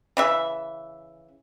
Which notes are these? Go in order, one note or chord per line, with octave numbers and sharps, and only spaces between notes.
C#3 E3 E5